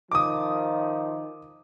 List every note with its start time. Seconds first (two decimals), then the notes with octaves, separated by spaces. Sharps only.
0.12 D#3 F3 D6 D#6